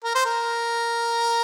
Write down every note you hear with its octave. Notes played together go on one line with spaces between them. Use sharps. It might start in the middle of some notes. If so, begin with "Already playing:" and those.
A#4
C5
A#4